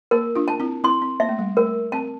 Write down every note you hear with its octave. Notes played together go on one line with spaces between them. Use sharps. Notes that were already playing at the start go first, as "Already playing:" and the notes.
A#3 A#4
D4 F4
A5
C4 E4
C4 E4 C6
C4
A#3 E5
A3
G3
A3 A#4
C4 A5